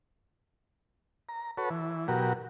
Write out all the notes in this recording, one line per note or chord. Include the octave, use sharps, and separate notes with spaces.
A#5
F#4 A4 B4 C#5
E3
B2 F#3 F#4 G4 A#4